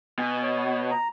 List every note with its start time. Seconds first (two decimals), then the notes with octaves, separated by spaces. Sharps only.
0.19 B2 G#5
0.43 C#5
0.91 A#5